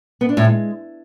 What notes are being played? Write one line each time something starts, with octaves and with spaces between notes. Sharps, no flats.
B3
D4
A2
G#3